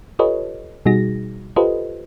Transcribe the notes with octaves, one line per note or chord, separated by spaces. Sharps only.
F4 G4 A4 B4 C#5 D#5
B2 G3 D#4 F#4 G#4 A#6
F4 G4 A4 B4 C5 D#5